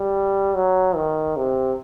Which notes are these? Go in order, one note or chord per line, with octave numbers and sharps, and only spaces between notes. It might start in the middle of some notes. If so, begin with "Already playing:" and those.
Already playing: G3
F#3
D#3
C3